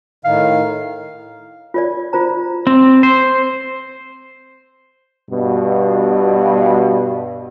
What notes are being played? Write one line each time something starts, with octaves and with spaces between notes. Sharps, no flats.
A2 D#3 F5
F4 C#5 D5
F4 C5 A#5
C4
C5
G2 B2